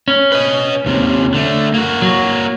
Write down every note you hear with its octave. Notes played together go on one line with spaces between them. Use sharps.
C#4
B4 D#5
D#2 C3
D3 A3
A#3 F#4
F#3